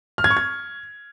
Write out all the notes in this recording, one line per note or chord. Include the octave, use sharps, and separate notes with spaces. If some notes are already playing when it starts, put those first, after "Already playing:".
F6
G#6
C#6
G#6